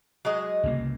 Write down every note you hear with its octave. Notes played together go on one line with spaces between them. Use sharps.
F#3 G#3 D#5
C2 C#3 A#3